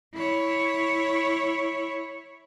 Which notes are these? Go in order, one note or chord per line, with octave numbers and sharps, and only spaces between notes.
E4 C#5